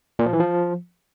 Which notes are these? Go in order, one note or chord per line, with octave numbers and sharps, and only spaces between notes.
A#2
F3
E3
F3